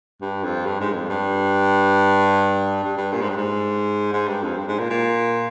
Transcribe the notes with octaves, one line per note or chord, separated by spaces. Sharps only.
G2
F2
G2
G#2
F2
G2
G2
G2
A#2
G#2
G2
G#2
G#2
G2
F2
G2
G#2
A#2
A#2